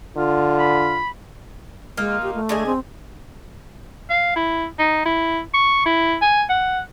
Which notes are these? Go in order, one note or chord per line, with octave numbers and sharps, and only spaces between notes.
D3 F4
B5
G#3 A#3 D#4 F4
G4
A3
D3 G#3 G#4
C4
F5
E4
D#4
E4
C#6
E4
G#5
F#5